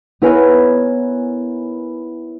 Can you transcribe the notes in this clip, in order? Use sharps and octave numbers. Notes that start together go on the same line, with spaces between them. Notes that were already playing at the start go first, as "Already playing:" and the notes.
B3 E4 A#4 B4 C#5 G#5